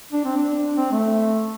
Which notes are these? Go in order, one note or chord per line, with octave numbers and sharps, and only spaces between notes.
D4
C4
D4
C4
A3